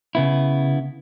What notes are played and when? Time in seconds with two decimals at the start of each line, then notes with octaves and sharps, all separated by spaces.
0.15 C#3 B3 E4